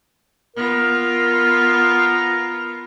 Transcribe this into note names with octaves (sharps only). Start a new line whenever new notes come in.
B3 F4 A#4